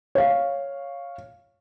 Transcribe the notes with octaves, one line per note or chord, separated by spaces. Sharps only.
C#5 F5